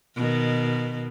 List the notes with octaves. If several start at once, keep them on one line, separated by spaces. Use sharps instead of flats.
B2 D#3